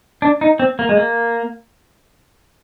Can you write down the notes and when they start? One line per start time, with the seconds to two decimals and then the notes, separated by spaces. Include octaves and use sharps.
0.22 D4
0.41 D#4
0.59 C4
0.79 A#3
0.89 G#3
0.97 A#3